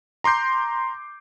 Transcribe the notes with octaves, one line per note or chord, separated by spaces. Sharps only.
A#5 C6 D6 G6 C7